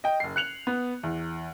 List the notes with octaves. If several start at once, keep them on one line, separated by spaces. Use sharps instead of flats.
D#5 G5
F#1 C7
F#6 C#7 F7 F#7
B3
E2